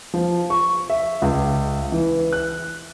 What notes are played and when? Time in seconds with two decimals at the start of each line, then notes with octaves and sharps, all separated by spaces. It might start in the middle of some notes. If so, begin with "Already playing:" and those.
0.14 F3
0.50 C#6
0.90 E5
1.22 C#2
1.92 E3
2.32 F#6